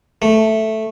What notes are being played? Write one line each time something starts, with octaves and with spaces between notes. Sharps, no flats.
A3